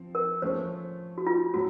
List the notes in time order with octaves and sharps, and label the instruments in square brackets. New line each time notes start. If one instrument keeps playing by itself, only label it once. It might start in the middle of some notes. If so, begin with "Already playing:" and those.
Already playing: [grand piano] F3 C4
[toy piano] A#4
[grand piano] F3 A3 C#4 [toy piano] C5
[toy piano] F#4
F4
[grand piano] A2 F#3 [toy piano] F#4